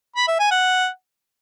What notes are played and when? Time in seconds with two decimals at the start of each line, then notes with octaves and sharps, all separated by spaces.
0.16 B5
0.28 E5
0.39 G#5
0.51 F#5